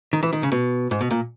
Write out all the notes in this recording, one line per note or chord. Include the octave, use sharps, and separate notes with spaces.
D#3
E3
D#3
C#3
B2
G#2
B2
A#2